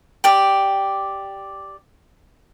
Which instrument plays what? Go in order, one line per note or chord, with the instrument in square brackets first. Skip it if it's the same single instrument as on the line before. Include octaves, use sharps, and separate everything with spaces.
[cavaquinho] G4 D5 G5